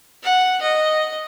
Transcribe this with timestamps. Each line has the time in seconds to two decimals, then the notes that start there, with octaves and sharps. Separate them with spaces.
0.23 F#5
0.62 D#5